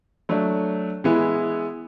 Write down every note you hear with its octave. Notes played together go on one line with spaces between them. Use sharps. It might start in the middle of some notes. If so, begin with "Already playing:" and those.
F#3 A3 D4
E3 G#3 B3 E4